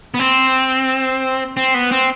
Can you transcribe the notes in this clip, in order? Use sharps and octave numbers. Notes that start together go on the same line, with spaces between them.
B3
C4
C4
B3
C4